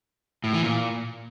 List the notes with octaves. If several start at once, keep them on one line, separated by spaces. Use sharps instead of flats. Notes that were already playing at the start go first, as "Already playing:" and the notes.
A2
E3
A#2